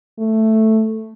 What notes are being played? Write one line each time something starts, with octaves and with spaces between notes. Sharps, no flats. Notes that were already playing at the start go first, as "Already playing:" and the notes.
A3